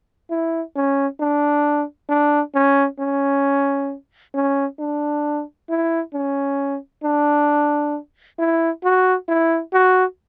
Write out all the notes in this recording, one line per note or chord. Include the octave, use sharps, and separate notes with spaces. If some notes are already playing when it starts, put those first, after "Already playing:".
E4
C#4
D4
D4
C#4
C#4
C#4
D4
E4
C#4
D4
E4
F#4
E4
F#4